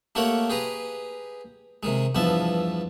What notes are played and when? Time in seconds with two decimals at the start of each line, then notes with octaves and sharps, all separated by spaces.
0.15 A3 A#3 G4 A#4 C#5 F#5
0.50 G4 G#4 B4 A#5
1.83 C3 D#3 G#3
2.15 E2 G2 F3 B3 E5 A5